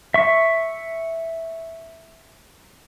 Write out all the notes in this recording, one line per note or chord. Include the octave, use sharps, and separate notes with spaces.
E5 C#6